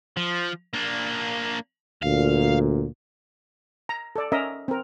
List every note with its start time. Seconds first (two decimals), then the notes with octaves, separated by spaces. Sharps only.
0.17 F3
0.73 A#3 D4
2.02 D2 A#2 F5
3.89 A#5
4.16 A4 D5
4.32 C#4 A#4 D#5 E5
4.68 C4 A#4